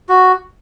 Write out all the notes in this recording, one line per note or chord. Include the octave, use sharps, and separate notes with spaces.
F#4